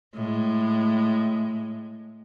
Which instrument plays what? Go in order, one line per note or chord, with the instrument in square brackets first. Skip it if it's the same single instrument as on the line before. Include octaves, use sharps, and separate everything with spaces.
[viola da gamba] A2 G#3